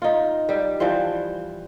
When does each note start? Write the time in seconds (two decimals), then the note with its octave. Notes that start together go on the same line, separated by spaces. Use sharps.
0.02 D#4 F4
0.49 G3 G4
0.80 E3 F3 G3 C5